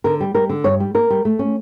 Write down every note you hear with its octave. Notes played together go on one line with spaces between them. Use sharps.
D3 A#4
G3
G3 A#4
D3
G2 C#5
G3
A#3 A#4
G3
A3
C#4